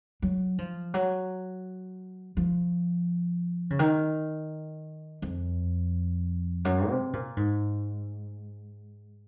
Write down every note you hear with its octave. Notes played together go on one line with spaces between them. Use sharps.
F#3
F3
F#3
F3
C#3
D#3
F2
F#2
C3
A#2
G#2